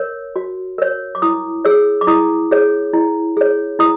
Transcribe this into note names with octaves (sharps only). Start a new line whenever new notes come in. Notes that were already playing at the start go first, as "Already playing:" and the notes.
Already playing: A#4 C#5
F#4
A#4 C#5
D6
E4 D#6
G#4 C#5 E6
D6
E4 D#6
G#4 C#5
E4
G#4 C#5
E4 D#6